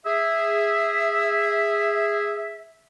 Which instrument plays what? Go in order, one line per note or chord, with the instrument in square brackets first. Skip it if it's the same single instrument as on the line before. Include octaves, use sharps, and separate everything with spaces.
[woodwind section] G#4 E5